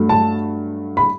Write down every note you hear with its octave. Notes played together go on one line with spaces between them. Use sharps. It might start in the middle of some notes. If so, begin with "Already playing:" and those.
Already playing: G2 F#3 A3
A5
B5